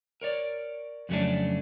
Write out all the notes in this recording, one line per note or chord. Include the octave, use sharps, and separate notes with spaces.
A#4 C#5 D5
F2 C#3 F#3 A3 C#4 D4